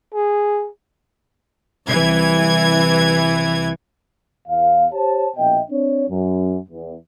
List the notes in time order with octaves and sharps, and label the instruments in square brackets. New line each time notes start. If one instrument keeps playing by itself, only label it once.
[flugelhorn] G#4
[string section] C2 E3 G#6
[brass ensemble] E2 F5
G4 C5 C#5 A5
A#1 B2 D#5 E5 G5
C4 D4 C#5
F#2
E2